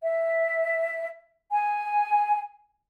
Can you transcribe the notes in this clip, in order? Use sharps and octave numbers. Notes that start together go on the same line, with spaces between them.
E5
G#5